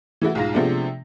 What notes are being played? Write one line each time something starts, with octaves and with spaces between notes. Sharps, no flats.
E3 A3 E4 F#4
B1 G#2 F4 F5 A#6
C3 F3 G#3 A3 B3 D4